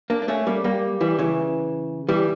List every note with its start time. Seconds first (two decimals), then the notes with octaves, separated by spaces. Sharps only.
0.10 A#3 D4
0.22 D4
0.28 A3 C#4
0.47 G3 A#3
0.64 G3 A#3
1.01 E3 G3
1.18 C#3 E3
2.09 E3 G3